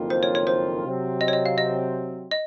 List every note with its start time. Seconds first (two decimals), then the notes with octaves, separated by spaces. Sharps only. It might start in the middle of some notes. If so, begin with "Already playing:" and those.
Already playing: F#1 F2 D#3 A#3 F4
0.10 C5
0.23 C#5
0.35 C#5
0.47 C5
0.84 C3 F#3 C4
1.21 D#5
1.28 C#5
1.33 D#5
1.46 F5
1.58 D#5
2.31 D#5